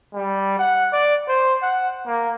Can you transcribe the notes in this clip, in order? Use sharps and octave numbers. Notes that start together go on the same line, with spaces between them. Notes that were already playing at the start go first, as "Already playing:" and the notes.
G3
F#5
D5
C5
F#5
A#3